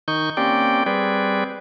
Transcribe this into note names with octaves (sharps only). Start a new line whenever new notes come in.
D#3 D#4 C#6 G6
A#3 C4 C#4 G4 D5 G5
G3 C4 G#4 B4 D5